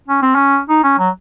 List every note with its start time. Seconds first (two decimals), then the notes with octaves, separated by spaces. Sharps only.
0.08 C#4
0.22 C4
0.35 C#4
0.69 D#4
0.83 C#4
0.99 F#3